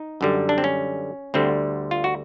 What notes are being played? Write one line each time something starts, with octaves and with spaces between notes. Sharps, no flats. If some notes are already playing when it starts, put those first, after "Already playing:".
Already playing: D#4
F#2 D3 G3
D4
C4
C#4
D2 D3 G3 C4
F4
F#4